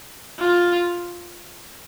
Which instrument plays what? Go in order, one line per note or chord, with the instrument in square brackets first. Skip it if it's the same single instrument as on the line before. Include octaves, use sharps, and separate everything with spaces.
[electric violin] F4